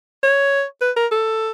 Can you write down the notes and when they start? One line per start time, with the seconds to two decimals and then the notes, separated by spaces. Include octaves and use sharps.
0.23 C#5
0.81 B4
0.96 A#4
1.11 A4